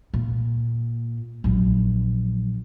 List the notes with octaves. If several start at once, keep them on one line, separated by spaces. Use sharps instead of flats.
A#2
A#1 F#3